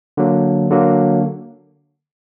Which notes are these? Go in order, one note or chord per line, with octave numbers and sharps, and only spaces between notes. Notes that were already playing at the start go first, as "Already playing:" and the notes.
D3 F#3 A#3
D3 F#3 A#3